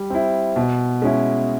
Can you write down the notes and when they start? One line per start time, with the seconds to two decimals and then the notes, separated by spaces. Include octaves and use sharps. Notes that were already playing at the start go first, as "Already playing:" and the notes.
Already playing: G3
0.10 C4 E4
0.56 B2
1.02 G#3 C#4 E4